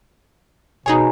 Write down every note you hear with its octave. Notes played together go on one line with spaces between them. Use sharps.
E1 B2 D#4 G#4 C#5 G#5 A#5